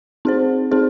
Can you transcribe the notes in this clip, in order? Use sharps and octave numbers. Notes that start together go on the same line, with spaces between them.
C4 D#4 G#4 C5
C4 D#4 G#4 C5